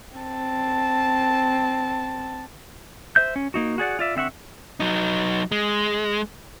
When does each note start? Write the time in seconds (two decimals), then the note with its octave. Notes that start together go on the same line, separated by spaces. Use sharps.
0.18 C4 A5
3.16 C5 E5 G6
3.36 C#4
3.54 A#3 D#4 F#4
3.78 F#4 G#4 D5 F#5
3.99 F4 D5 E5
4.15 D3 C4 E5 F#5 C#6
4.80 F#3 D#4
5.52 G#3